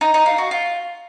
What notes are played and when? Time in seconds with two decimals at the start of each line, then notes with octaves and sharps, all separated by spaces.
0.01 D#4
0.14 D#4
0.26 F4
0.38 F#4
0.51 F4